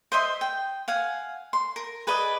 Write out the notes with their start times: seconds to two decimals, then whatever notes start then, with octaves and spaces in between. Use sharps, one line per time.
0.12 C5 D#5 E5 C6
0.41 G5
0.88 F5 F#5 G#5
1.53 C6
1.76 A#4
2.07 G#4 B4 D5 D#5